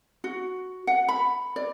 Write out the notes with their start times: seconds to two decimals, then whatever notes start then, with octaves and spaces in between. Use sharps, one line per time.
0.24 F#4
0.87 F#5
1.09 B5
1.56 D5